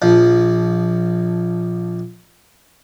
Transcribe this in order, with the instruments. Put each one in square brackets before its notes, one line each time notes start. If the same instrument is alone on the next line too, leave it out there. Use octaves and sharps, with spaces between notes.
[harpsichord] A#1 F3